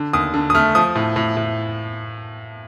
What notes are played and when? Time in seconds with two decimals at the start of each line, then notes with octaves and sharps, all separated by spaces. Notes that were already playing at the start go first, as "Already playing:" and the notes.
Already playing: D3
0.13 D#2 D#6
0.34 D3
0.50 D#6
0.55 A3 F6
0.75 F3 D#6
0.95 A2
1.16 A2
1.37 A2